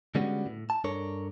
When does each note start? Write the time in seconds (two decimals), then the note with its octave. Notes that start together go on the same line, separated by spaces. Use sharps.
0.15 D3 G3 G#3 B3 C#4 F#4
0.46 A2
0.70 A5
0.84 G2 D4 A4 A#4 C#5